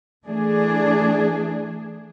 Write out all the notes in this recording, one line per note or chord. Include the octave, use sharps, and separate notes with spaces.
E3 A3 D4 G#4